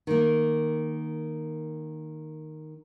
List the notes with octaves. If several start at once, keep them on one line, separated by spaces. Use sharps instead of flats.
D#3 A#3